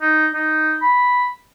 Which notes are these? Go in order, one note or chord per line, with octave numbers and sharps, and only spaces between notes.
D#4
D#4
B5